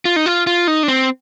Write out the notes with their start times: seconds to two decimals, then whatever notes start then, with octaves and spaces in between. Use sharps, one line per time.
0.05 F4
0.16 D#4
0.26 F4
0.47 F4
0.68 D#4
0.83 D4
0.88 C4